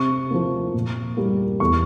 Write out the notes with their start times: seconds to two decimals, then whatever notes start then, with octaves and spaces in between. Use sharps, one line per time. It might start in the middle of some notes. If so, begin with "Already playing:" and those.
Already playing: C3 C#6
0.31 F3 A#3
0.74 A#2
1.17 G3 A#3
1.60 E2 C#6